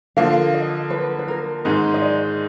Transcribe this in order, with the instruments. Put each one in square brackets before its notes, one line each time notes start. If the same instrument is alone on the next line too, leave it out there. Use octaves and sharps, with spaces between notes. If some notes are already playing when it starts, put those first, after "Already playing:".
[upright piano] D3 F3 A#3 [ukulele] F5
[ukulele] D#5
B4
B4
A#4
[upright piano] G#2 D#3 G#3 D#4
[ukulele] D#5
D5